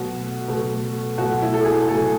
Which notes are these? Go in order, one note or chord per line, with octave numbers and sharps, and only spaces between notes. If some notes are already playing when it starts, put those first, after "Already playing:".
Already playing: B2 F#3 A3 F#4
B2 F#3 A3
B2 F#3 A3 F#4
E4
A4
G#4
B2 F#3 A3 A4